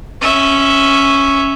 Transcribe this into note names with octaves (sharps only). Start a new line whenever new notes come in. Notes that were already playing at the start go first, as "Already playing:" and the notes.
C#4 E5